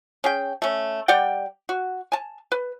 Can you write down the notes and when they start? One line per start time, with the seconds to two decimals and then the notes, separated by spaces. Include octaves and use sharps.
0.24 C#4 G#4 G5
0.62 A3 C#4
1.08 G3 D5 F#5 G5
1.69 F#4
2.12 G#5 A5
2.52 B4